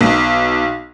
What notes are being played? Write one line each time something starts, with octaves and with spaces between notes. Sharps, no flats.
B1